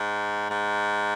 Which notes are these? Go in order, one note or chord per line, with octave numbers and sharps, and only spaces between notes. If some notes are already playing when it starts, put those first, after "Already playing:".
Already playing: G#2
G#2